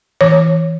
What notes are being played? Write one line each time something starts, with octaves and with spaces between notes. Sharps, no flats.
E3 C#5